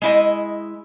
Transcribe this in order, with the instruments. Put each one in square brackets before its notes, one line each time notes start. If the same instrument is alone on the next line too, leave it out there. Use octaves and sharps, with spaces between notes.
[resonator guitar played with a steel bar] G#3 E4 D#5